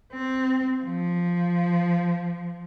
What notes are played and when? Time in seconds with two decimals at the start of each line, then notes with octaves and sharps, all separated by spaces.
0.13 C4
0.84 F3